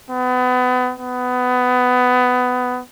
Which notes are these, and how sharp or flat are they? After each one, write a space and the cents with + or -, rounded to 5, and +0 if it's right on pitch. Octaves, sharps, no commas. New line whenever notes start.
B3 +30
B3 +20